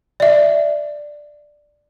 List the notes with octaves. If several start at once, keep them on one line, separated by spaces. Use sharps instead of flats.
D5 E5